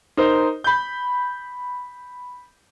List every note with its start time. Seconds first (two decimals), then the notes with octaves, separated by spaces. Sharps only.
0.17 D#4 A#4 C5
0.64 B5 G6